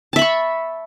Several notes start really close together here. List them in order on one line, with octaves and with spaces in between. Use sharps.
A5 E5 B5 C#6